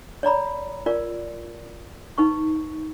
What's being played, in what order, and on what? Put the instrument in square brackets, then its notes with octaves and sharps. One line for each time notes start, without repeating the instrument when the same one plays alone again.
[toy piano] C#5 D5 A#5 B5
F4 A#4 D5
D#4 B4 C#6